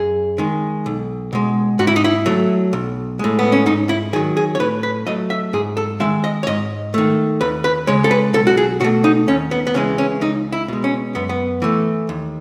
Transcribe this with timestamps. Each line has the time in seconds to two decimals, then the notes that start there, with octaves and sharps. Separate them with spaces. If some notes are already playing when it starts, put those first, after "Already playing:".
Already playing: F#2 G#4
0.38 D#3 G#3
0.86 B1
1.33 B2 G#3
1.79 G#2 F#4
1.87 E4
1.96 D#4
2.04 E4
2.26 F#3 A3
2.73 B1
3.19 A2 G#3
3.39 B3
3.52 C#4
3.66 G#2 D#4
3.89 E4
4.13 D#3 G#4
4.16 F#3
4.37 G#4
4.55 C#5
4.60 A2 B4
4.83 B4
5.07 F#3 A3 D#5
5.30 E5
5.53 G#2 G#4
5.77 A4
6.00 D#3 G#3 E5
6.24 D#5
6.43 C#5
6.47 G#2 D#5
6.94 D#3 A3
7.41 D#2 B4
7.64 B4
7.87 C#3 G#3 C#5
8.04 A4
8.11 B4
8.34 B1 A4
8.47 F#4
8.57 G#4
8.81 B2 A3 F#4
9.04 D#4
9.28 D#2 C#4
9.51 B3
9.67 B3
9.74 C#3 E3 G#3 C#4
9.98 C#4
10.21 C#2 D#4
10.52 E4
10.68 B2 G#3
10.84 C#4
11.15 F#2 B3
11.29 B3
11.62 E3 A3
12.09 D#2